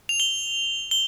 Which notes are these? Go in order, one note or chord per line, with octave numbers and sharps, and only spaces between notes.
F7
G7
G7